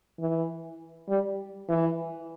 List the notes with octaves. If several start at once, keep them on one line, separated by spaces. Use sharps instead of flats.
E3
G3
E3